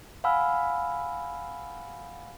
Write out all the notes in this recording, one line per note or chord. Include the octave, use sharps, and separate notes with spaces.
F5 F#5 G#5 B5 E6 F6